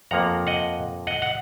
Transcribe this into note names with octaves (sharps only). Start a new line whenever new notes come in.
F2 F3 A#3 F#5 A#5
D#5 F#5
D#5 F#5
F#5